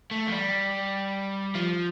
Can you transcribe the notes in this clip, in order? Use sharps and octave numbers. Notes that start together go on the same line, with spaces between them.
A3
F3
G3
F3